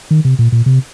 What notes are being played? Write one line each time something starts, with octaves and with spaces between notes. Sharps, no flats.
D#3
C3
A#2
A#2
C3